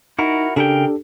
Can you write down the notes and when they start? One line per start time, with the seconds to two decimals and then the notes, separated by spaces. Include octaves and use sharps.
0.19 D#4 E4 F#4 A#4
0.56 C#3 D4 G4 A4 A#4 G5